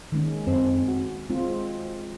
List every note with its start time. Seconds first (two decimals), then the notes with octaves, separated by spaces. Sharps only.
0.12 D#3 G#3 C#4
0.47 F#2 C4
0.88 F#4
1.30 G#3 C4 F4